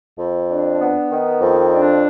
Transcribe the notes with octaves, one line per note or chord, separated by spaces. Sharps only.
F2
D4
B3
D#3
F2
D4